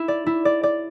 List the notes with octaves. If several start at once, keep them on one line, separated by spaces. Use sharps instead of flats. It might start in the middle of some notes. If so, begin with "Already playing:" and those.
Already playing: E4
D5
E4
D5
D5